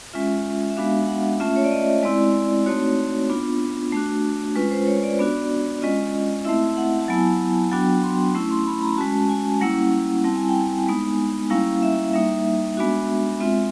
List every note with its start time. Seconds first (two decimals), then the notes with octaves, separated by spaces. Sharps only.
0.14 G#3 C#4 F4 E5
0.70 E5
0.77 G#3 B3 D4 F#4 F5
1.08 F#5
1.40 A3 C#4 F4 E5
1.56 C#5
1.64 D5
1.71 D#5
2.03 G#3 C4 E4 D5
2.66 A3 C4 D#4 F#4 C#5
3.29 B3 D4 F4
3.92 A3 D4 F#4
4.56 G#3 C#4 F4 B4
4.71 C5
4.87 C#5
5.03 D5
5.19 B3 D4 F#4
5.82 G#3 C#4 F4 D#5
6.45 A3 C4 E4 E5
6.77 F#5
7.01 A5
7.08 F#3 B3 E4 G#5
7.72 F#3 B3 D4 F#4 G5
8.03 C6
8.35 A3 C#4 E4
8.51 C6
8.66 B5
8.82 A#5
8.98 G#3 C#4 F#4 A5
9.29 G#5
9.61 G3 A#3 C#4 E4 F#5
10.24 G3 C4 E4 A5
10.36 G#5
10.48 G5
10.59 G#5
10.87 G#3 B3 D#4
11.50 G3 A#3 C#4 E4 F5
11.83 E5
12.13 G3 A#3 D#4 E5
12.77 G#3 B3 D4 F#4
13.40 G#3 C4 F4 E5